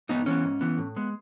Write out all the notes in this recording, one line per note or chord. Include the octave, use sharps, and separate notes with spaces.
G#2 B3 D#4
E3 B3 C#4
G#2
E3 B3
A2
G#3 B3